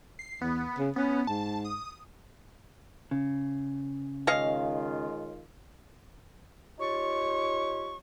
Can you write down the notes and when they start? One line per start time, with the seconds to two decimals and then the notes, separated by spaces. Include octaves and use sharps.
0.19 C7
0.41 E2 B3
0.78 C#3
0.96 B3 C#4
1.27 G#2 A5
1.65 D#6
3.11 C#3
4.27 D#3 G#3 C#4 F4 D#5 F5
6.78 D#4 F4 G4 C#5 C#6